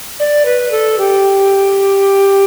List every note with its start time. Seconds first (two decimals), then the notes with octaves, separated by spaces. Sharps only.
0.20 D5
0.45 B4
0.71 A4
0.98 G4